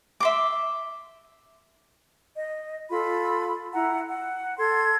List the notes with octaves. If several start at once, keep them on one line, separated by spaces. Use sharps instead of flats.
E5 C6 D6
D#5
F4 A4 B5
E4 F#5 A#5
F#5
A4 C6 G#6